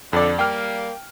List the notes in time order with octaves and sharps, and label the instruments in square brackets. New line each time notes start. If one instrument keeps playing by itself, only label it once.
[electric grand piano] F2 D5 [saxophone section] D3
[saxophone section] G3 A#3 [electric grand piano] G5 F6